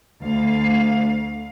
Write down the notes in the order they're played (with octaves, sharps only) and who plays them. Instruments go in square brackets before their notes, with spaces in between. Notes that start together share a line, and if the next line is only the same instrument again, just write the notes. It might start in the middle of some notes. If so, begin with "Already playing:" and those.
[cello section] D2 F5